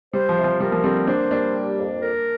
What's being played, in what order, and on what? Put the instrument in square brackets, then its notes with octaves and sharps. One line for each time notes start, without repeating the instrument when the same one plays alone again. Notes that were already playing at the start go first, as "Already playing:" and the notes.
[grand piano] G3 [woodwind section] C5
[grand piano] F3
[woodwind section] C3
[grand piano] F3
[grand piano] G3 [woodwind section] A#4
[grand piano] F3 A#3
[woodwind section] D3 [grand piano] G3 C4
[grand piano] A#3 D4 [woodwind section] C5
[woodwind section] G3 [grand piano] A#3 D4
[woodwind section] G4
F2
A#4